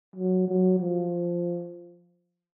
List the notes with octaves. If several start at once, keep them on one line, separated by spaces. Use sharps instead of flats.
F#3
F#3
F3